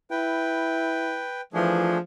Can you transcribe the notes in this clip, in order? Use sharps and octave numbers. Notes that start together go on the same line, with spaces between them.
E4 B4 G5
E3 F3 A3 D4 G#4